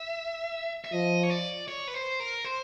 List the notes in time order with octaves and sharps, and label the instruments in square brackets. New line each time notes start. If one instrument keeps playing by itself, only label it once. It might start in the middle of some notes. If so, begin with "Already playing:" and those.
Already playing: [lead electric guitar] E5
E5
[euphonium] F3 [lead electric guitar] D#5
[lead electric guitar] C#5
D5
C#5
B4
C5
A#4
C5